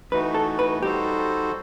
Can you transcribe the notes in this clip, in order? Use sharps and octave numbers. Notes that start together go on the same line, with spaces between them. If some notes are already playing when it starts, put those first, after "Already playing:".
E3 A3 D#4 F#4 B4
A4
B4
G3 D#4 F#4 G4 A4 C5